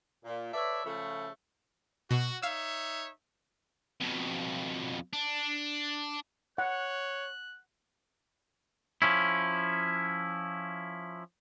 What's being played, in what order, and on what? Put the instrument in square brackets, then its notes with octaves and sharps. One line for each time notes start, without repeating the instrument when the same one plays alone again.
[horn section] A#2
A4 B4 C#5 D5 E5
C#3 F3 A3
[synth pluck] B2 [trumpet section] F#4
[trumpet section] D#4 C#5 E5 [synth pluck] F5 E6
[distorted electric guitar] F2 B2
D4
[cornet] C#5 [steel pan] F#5 [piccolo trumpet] F#6
[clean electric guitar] F3 C#4 E4